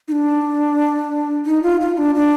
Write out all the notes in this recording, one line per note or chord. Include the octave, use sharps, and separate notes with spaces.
D#4
D4
D#4
F4
F4
D4
D4